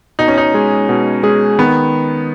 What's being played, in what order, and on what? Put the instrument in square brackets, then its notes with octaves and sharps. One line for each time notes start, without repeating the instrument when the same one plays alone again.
[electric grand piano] B2 [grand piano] D#4
[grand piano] C#4
D#4
[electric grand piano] G#3 C#4 G#4
B2
G#3 C#4 G#4
[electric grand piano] D#3 [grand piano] B3